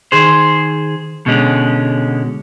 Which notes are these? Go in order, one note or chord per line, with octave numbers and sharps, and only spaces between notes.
D#3 G#4 C5
B2 D3 G#3 C#4